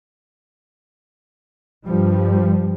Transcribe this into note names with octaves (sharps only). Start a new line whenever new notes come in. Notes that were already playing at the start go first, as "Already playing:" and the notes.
G2 F3 G3